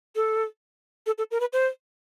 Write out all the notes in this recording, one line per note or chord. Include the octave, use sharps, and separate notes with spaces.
A4
A4
A4
A#4
B4
C5